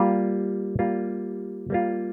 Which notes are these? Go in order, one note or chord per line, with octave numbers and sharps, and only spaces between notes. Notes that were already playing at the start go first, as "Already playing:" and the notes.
Already playing: G3 A#3 F4
G3 A#3 F4
G3 A#3 F4